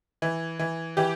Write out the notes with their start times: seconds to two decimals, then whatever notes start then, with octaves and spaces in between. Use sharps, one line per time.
0.22 E3
0.59 E3
0.97 E3 G4